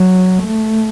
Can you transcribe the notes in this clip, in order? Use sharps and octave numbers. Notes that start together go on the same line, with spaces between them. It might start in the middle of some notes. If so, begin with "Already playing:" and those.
Already playing: F#3
A3